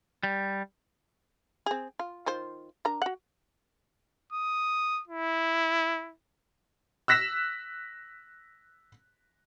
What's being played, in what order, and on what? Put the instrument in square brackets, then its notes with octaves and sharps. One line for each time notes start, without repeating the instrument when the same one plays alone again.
[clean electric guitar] G3
[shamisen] C4 G#4
F4
D#3 F4 C5
D4 A#4 A#5
F#4 F#5
[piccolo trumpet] D#6
E4
[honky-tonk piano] E6 F#6 A#6 B6 E7